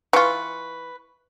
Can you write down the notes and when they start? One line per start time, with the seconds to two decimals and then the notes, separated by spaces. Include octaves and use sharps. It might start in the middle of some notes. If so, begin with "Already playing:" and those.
0.13 E3 F4 B4 C#6